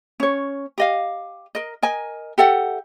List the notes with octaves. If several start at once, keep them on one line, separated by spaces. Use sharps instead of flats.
C#4 C#5
G4 D#5 F5
A#4 D#5
A#4 D#5 G#5
G4 A4 E5 F#5